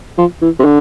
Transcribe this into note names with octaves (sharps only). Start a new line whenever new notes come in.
F3
E3
C3
D3